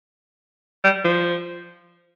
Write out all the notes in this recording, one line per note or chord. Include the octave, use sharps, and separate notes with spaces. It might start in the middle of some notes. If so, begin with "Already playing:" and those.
G3
F3